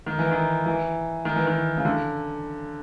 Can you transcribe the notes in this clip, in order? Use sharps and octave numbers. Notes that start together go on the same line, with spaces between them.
D#3
E3
D#3
E3
D#3
E3
D#3
C#3
D3